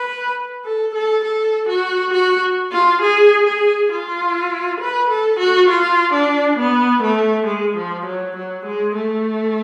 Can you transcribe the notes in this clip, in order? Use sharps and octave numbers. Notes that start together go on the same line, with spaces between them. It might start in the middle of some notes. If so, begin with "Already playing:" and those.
Already playing: B4
A4
A4
A4
F#4
F#4
F4
G#4
G#4
F4
B4
A4
F#4
F4
D4
B3
A3
G#3
F3
F#3
F#3
G#3
A3